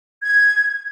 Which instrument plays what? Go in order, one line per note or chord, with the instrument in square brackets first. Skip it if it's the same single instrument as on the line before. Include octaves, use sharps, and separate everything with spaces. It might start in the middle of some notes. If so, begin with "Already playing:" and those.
[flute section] G#6